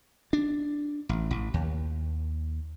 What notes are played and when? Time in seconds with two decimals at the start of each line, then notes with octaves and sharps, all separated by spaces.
0.33 D4
1.09 A1
1.31 A1
1.54 D#2